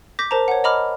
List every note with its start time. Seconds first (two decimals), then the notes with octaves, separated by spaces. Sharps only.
0.19 D6 G6 A#6 B6
0.31 A#4 C5 A5 A#5
0.48 C#5 F#5
0.64 D#5 A#5 B5 D6 F6